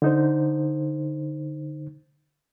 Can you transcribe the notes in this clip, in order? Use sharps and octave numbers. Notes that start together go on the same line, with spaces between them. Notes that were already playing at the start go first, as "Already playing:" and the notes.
D3 D#4 C5